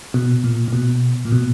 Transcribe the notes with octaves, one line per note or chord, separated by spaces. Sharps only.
B2
A#2
A#2
B2
A#2
B2